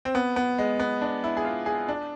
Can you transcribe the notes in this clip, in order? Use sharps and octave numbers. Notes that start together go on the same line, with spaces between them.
C4
B3
B3
G#3
B3
D4
E4
G#4
F4
G#4
D4